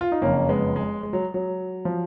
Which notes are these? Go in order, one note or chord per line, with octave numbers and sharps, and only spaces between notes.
F4
D#4
F#1 F2 C#3 A#3 C#4
G#3 B3
G#3
G#3
F#3
F#3
F3